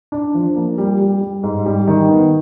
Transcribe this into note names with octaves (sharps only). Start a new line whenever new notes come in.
D4
F3
A#3
G3
G3
G3
G#2
G3
D#3
B3